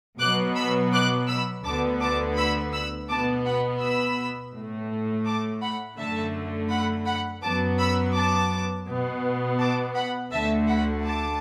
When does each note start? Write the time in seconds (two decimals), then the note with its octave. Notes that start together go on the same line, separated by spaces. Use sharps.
0.19 B2 F#3 B3 D6 F#6
0.56 B5 E6
0.93 D6 F#6
1.27 B5 E6
1.64 D2 D3 B3 A5 D6
2.00 A5 D6
2.36 B5 E6
2.73 B5 E6
3.09 B2 B3 A5 D6
3.45 F#5 B5
3.81 B5 E6
4.54 A2 A3
5.25 A5 D6
5.62 F#5 B5
5.97 F#2 D3 A3 E5 A5
6.70 F#5 B5
7.06 F#5 B5
7.42 F#2 F#3 B3 A5 D6
7.78 B5 E6
8.15 A5 D6
8.88 B2 B3
9.59 A5 D6
9.95 F#5 B5
10.32 D2 D3 A3 E5 A5
10.67 F#5 B5
11.04 A5 D6